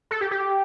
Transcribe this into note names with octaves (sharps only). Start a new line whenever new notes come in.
A4
G4
G4